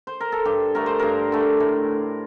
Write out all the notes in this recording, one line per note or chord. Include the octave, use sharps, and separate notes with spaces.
C5
A#4
A4
G2 G4
D3 A3 A#4
C5
G2 A#4
D3 A3
A2